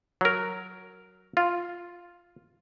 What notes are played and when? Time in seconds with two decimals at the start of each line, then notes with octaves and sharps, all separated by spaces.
0.21 F#3 A#4
1.37 F4